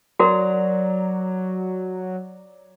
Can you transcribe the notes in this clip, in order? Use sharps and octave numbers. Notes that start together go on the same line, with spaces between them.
F#3 F#4 A#4 C#5 D5 A#5